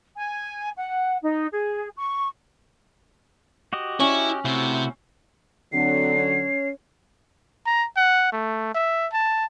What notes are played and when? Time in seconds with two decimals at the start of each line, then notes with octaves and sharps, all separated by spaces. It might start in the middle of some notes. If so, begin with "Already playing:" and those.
0.16 G#5
0.76 F#5
1.22 D#4
1.53 G#4
1.97 C#6
3.73 F#4 G4 D#5
4.00 C#4 E4
4.45 C3 A3 E4 F#4
5.73 D3 F#3 C4 D4 C7
6.18 C#4 C#5
7.66 A#5
7.96 F#5
8.33 A3
8.75 E5
9.13 A5